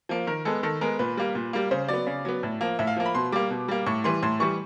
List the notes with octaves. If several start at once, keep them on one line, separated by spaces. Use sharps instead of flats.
F3 A#3
D#3 A#4
G#3 B3 A4
D#3 A4
G#3 B3 A#4
A#2 B4
G3 A#3
A#2
G3 A#3
C#3 C5
F#3 B3 D5
C#3
F#3 B3
A2
F3 A#3
A2 E5
F5
F3 A#3
B5
B2 C6
G3 A#3 D6
B2
G3 A#3
A2 C#6
E3 G3 C6
A2 C6
E3 G3 C#6